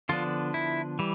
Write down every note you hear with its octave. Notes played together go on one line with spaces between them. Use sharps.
D3 F3 B3 D4 F4
E4
E3 G3